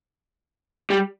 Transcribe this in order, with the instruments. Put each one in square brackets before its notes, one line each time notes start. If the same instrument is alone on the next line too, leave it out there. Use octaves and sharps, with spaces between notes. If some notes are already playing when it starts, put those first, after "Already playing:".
[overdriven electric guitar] G3